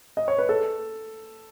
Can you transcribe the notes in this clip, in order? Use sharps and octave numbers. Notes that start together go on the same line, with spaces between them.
D#5
C#5
B4
A4